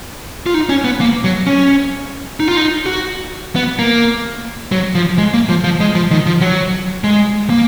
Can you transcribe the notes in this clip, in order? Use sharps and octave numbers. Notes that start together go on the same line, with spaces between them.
F4
D#4
C#4
B3
A#3
F#3
C#4
D#4
F4
D#4
F#4
B3
A#3
F#3
F3
G#3
A#3
F3
F3
G#3
F3
D#3
F3
F#3
G#3
A#3